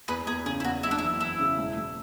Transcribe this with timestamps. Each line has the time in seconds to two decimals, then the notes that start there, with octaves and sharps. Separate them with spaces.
0.08 E2 G#4 B4
0.27 E2 G#4
0.46 C#3 G#4
0.60 E4
0.64 E2 F#4
0.83 F#1 E4
0.91 D4
0.98 E4
1.02 E3
1.21 E2 E4
1.40 C#3
1.58 E1
1.77 E1